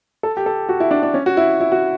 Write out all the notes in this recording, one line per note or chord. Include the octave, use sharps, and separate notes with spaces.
A4
G4
A4
F#4
E4
D4
D4
C#4
F#4
E4
E4
F#4